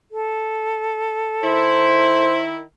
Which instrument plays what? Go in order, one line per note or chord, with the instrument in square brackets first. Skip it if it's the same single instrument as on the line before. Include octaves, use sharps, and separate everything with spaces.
[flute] A4
[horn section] D#3 E4 [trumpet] C5